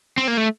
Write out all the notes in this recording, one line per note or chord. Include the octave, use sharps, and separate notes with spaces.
C4
A#3
A3